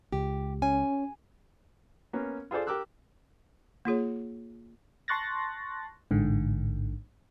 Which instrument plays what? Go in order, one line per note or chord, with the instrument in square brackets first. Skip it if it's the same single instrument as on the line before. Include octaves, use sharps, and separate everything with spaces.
[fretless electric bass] C#2 [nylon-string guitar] G4
[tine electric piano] C#4 [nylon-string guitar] G#5
[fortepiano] A#3 B3 C#4
F4 G#4 A4 C5 D5
G4 A#4 D6 E6 F#6
[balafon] A#3 F4 G#4 C#5
[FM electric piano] A5 C6 C#6 F#6 A6 A#6
A1 G#2 D3